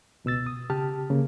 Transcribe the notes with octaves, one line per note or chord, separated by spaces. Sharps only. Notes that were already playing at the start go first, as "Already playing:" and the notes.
C#2 B2 E6 A6
D#6
C#3 G4 A5 F6
C#3 A#3